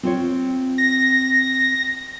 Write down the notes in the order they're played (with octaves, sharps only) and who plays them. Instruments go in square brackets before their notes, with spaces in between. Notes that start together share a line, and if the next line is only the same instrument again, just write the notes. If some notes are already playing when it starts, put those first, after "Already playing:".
[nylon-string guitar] C4 F4 C#5
[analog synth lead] A#6